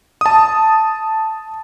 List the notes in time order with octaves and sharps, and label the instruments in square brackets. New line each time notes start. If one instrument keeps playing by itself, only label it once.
[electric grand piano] A5 D#6